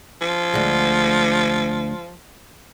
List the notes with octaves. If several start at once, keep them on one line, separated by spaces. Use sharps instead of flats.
F3
D2 G#3